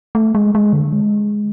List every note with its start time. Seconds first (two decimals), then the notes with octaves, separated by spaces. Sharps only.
0.15 A3
0.35 G#3
0.55 G#3
0.73 D3
0.93 G#3